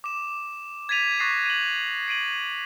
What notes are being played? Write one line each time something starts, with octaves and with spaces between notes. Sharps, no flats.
D6 E7
G#6 A6 B6 D#7 F7
C#6 D#6 F#6 A6 A#6 C7
D#7 F#7
C7 D7 D#7 F#7